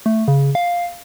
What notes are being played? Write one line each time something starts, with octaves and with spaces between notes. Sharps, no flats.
A3
C#3
F5